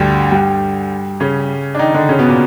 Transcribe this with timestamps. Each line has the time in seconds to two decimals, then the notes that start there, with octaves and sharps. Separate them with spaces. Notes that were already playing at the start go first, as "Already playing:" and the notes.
Already playing: D2 G2 D3 G3
0.31 G2 G3
1.20 C#3 C#4
1.75 D4
1.79 D#3 D#4
1.94 D3 D4
2.09 C#3 C#4
2.19 B2 B3
2.29 A#2 A#3